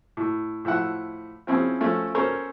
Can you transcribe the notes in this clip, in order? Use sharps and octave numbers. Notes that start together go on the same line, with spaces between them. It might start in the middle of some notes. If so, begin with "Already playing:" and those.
A2
A2 F3 E5 F#5
F3 C4 C#4 E4 G#4
F3 A3 C#4
C#4 A4 A#4 C5 C#5